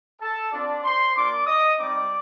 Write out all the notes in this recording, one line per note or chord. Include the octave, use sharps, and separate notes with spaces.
A4 A5
C4 D4 F4 D5
C5 C6
A#3 D4 F4 D5 D6
D#5 D#6
G3 C4 D#4 G4 D5 D6